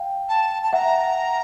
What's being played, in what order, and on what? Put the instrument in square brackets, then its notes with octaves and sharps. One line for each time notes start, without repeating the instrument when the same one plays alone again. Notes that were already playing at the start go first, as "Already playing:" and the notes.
Already playing: [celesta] F5 G5
[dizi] A5
A5
[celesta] E5 F#5 [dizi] A#5